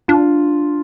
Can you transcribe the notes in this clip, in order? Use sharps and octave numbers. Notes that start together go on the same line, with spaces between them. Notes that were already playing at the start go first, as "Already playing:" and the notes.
D4 F4